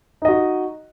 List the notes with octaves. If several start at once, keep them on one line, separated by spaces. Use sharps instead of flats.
D#4 F#4 D#5